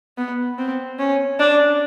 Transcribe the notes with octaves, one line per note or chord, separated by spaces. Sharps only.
B3
C4
C#4
D4